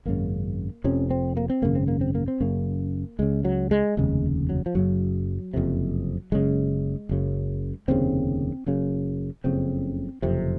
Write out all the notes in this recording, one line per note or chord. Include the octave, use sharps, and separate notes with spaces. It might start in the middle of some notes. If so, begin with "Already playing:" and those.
G#1 F#2 C#3 A#3
F1 F2 C3 C#4
C4
A#3
C4
G#1 F#2 C#3 A#3
C4
A#3
C4
A#3
C4
F#1 F#2 C#3 A#3
C#2 C#3 G#3
F#3
G#3
F1 D#2 C#3 G#3
F#3
F3
F#1 F#2 C#3 F#3
F#1 F2 C3
F#1 F#2 C#3 G#3
F#1 F#2 C#3
F1 D#2 C#3 C4
F#1 F#2 C#3
F#1 F2 C#3 C4
F#1 F2 C3